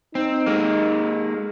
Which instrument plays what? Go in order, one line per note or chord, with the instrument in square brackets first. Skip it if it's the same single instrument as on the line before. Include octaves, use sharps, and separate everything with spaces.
[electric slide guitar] C4 [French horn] D#4
[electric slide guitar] G#3 A#3